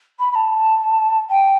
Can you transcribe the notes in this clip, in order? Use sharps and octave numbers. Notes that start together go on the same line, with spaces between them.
B5
B5
A5
G5